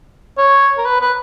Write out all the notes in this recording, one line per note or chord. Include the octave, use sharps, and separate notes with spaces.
C#5
A#4
B4
B4